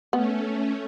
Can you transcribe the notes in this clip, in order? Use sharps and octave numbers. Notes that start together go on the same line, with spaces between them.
A3 B3 C#4